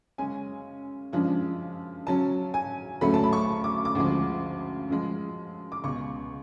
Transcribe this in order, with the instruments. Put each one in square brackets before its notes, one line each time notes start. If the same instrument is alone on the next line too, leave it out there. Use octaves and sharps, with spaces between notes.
[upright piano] F#2 C#3 G#3 C#4 G#5
F#2 C#3 F3 G#3 D4
C#3 F#3 C#4 A5
G#5
D2 C#3 F#3 A3 C#4 B5
A5
B5
C#6
D6
D6
D2 C#3 F3 G#3
F#2 F3 G#3
D6
C#2 B2 G#3 C#6